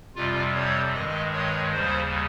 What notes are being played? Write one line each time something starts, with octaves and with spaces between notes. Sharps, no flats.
F2 C3 G3 F4
C#5
G2 D#3 G#3 D#5
C#5
D#2 C#3 G3 C5